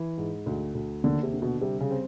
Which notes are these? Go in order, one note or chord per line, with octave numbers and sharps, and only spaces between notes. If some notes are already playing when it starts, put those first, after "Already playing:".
Already playing: E3
G#2
D2
D2
D#2 D3
C3
D3
B2
C3 G3
C#3
C4